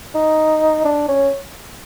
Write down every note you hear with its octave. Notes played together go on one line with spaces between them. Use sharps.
D#4
D4
C#4